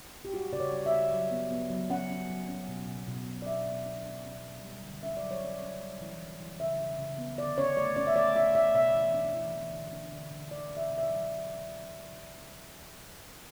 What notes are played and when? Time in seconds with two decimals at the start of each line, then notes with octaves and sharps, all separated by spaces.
0.25 G4
0.33 G3 F#4
0.53 C#3 D5
0.60 C#5
0.72 G3
0.86 E5
0.93 C#3
1.13 F#3
1.31 B3
1.51 B3
1.70 F#3
1.90 C#4 F#5
2.10 C#4
2.29 F#3
2.48 C#4
2.68 B2
2.88 B2
3.07 B2
3.27 F#3
3.42 D5
3.46 D4 E5
3.66 B2
3.86 D4
4.05 D4
4.25 C#4
4.45 C#4
4.64 G3
4.83 D3
5.03 C#4 E5
5.17 D5
5.23 F#3
5.31 C#5
5.42 C#4 D5
5.62 C#4
5.81 G3
6.01 E3
6.20 E3
6.40 E3
6.60 C#3 E5
6.80 C#3
6.99 C#3
7.18 B3
7.38 D3 D5
7.57 C#4 C#5
7.77 A3 D5
7.97 C#4 D5
8.07 E5
8.16 A3 D5
8.35 A3 E5
8.55 A3 E5
8.74 B2 E5
8.94 E3
9.14 D4
9.33 E3
9.53 E3
9.73 D3
9.93 D4
10.12 D3
10.31 D3
10.51 D4 D5
10.71 D4
10.77 E5
10.90 B2
10.98 E5
11.03 D5
11.10 F#3